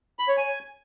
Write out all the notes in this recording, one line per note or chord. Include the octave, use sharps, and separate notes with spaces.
B5
C#5
G#5